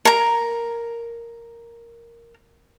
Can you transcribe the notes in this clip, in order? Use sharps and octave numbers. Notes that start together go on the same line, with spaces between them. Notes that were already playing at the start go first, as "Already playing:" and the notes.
A#4 A#5